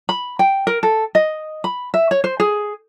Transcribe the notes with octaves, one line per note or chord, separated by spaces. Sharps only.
B5
G5
A#4
A4
D#5
B5
E5
C#5
C5
G#4